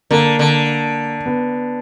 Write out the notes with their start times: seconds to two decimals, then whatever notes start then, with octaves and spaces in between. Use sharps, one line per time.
0.11 D3 A#3
0.39 D3
1.26 B3